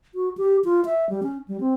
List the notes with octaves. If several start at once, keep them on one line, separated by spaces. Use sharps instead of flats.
F#4
G4
F4
E5
G3
C#4
G3
C4